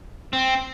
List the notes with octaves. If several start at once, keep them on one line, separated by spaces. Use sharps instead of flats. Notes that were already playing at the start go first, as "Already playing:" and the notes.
C4